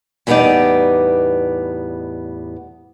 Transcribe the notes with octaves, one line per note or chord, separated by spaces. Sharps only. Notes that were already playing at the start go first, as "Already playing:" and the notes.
E2 A2 G3 B3 D#4 D5